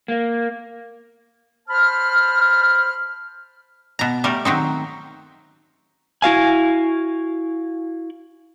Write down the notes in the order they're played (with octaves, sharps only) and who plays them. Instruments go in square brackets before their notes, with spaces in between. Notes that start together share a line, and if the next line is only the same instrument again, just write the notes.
[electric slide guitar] A#3
[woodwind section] C5 A5 B5 F6
[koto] B2 A#5
G3 A3 A#4
D#3 F#3 C4 D#4
[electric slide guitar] E4 F#4 F5 G#5